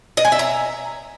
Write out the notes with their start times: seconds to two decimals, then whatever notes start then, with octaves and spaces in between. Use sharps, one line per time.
0.17 D#5
0.25 G#5
0.32 E5
0.39 A#5